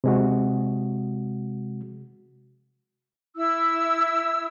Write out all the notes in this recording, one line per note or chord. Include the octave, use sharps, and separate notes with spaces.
C3 G#3 F#4
E4 E6